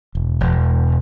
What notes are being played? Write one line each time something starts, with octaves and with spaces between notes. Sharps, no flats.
E1
E1